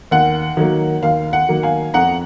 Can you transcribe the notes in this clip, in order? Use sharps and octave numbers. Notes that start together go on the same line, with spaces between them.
D#2 F#5
D#3 F#3 A#3
D#2 F5
F#5
D#3 F#3 A#3
F5 G#5
F2 F#5 A#5